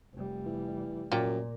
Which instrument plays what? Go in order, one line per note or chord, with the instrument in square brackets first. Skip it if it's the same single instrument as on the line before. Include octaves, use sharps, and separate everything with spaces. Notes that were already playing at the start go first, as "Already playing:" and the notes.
[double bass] F1 G3
[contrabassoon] E3
[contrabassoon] F#2 [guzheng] A#2 [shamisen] F4 G4